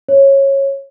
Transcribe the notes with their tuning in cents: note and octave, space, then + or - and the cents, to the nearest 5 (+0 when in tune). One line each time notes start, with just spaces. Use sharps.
C#5 -15